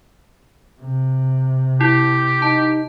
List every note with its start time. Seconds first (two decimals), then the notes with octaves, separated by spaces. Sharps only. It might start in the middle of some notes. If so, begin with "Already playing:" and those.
0.81 C3
1.81 E4 G4
2.42 D#4 A5